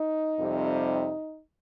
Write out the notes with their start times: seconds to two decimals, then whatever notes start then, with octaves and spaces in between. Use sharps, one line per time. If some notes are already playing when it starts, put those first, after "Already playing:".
Already playing: D#4
0.39 F2 C3 G3